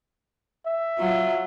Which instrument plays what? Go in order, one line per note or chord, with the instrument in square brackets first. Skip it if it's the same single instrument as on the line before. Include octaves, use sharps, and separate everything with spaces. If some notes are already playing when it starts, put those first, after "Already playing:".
[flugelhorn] E5
[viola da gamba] F#3 F4